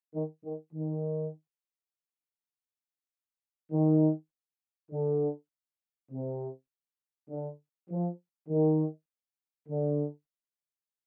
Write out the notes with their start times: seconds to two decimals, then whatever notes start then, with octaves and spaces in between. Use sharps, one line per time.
0.14 D#3
0.44 D#3
0.73 D#3
3.72 D#3
4.92 D3
6.11 C3
7.30 D3
7.89 F3
8.49 D#3
9.69 D3